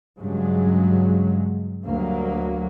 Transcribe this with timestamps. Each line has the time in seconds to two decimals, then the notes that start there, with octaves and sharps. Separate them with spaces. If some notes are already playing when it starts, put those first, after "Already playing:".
0.19 G2 C#3 F#3 G#3
1.85 D2 F#3 G3 A#3